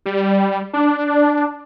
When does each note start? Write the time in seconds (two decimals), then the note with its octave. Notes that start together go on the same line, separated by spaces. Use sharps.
0.06 G3
0.73 D4